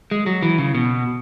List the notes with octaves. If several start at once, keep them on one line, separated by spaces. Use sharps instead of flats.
G#3
F#3
E3
C#3
B2